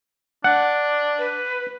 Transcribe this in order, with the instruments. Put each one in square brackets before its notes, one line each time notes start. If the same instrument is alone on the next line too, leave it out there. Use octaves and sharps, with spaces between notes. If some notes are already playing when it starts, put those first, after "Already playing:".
[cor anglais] D4 [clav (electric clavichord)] F#5
[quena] B4